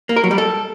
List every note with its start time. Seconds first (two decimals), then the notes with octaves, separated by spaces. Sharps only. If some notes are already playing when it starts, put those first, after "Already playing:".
0.09 A#3
0.16 A#4
0.24 F#3
0.31 G3
0.38 A4